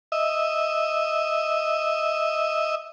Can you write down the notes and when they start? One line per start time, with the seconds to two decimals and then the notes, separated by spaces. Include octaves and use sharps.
0.12 D#5 E5